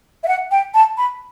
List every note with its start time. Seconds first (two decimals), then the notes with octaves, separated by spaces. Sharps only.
0.23 E5
0.28 F#5
0.51 G5
0.74 A5
0.98 B5